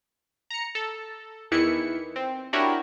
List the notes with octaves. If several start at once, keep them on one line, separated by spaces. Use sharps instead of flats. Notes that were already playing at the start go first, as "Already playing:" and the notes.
A#5 C#7
A4
E2 D#3 E3 E4 C#7
C4
D4 E4 F#4 G4 A#4 C#5